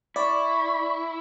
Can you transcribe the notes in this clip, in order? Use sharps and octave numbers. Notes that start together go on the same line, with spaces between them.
E4 D5 C#6